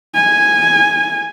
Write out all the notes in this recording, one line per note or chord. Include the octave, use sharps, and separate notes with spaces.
G#5